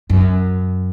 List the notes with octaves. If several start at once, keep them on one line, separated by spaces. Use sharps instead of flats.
F#2